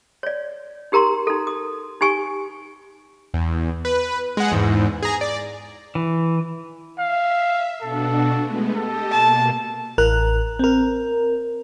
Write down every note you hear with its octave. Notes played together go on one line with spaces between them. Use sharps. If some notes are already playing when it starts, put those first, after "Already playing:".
C#5 D5
D#4 G4 A#4 A#5 C6
D#4 A4
D#6
D#4 G4 G#5 C#6
E2
B4
G#3 F#5
E2 G#2
G#4 A#5
D5
E3
E5 F5
B2 D4 F#4 A4
G#3 A3 B3
G4 A4 D#5
B2 A#3 A5
A1 A#4 F#6
C4 A#4